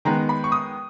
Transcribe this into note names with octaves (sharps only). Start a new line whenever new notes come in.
D#3 G#3 B3 A#5
B5
C#6
D#6